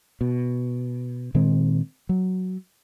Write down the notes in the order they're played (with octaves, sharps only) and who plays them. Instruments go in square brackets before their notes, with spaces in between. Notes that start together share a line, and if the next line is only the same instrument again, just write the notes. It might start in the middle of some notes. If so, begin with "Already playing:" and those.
[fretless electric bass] B2
A#2 D#3 G#3 C4
F#3